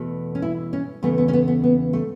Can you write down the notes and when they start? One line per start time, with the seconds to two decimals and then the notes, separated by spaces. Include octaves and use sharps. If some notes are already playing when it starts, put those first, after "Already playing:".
Already playing: E2 B2 A3
0.35 C#4
0.42 E4
0.73 C#4
1.03 E2 C#3 A3 B3
1.18 B3
1.28 C#4
1.33 B3
1.48 B3
1.64 B3
1.93 A3